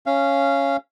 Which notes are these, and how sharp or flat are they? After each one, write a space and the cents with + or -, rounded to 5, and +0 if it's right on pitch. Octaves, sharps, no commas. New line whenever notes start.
C#4 +0 F5 -20